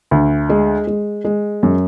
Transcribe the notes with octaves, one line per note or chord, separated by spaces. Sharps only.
D2
G#3
G#3
G#3
F#2